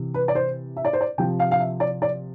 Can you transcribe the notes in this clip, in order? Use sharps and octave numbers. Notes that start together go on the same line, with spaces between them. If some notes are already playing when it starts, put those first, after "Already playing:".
Already playing: C3 E3
B4
D5
C5
E5
D5
C5
D5
C3 F3 G5
F5
F5
E5
D5
D5